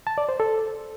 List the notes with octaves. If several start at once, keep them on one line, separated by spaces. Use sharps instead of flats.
A5
D5
C5
A4